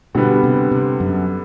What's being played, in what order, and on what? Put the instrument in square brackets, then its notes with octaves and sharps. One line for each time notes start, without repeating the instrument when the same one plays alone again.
[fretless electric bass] B2 [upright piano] D3 G3 B3
[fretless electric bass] C3
C3
F#2